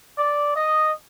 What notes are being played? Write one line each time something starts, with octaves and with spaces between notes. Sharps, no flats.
D5
D#5